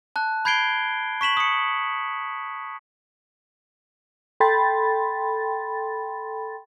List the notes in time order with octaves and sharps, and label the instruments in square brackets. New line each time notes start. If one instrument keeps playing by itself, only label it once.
[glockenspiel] A5 F#6
B5 G6 G#6 C7 D7 G7
C#6 B6 E7 F#7
D#6 C#7
[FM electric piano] A4 G5 B5 C6 A6